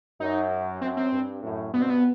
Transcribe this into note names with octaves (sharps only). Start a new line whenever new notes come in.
F#2 D#4
F#2 C4
C4
G2
F#2 A2
G2 B2 B3
C4
B3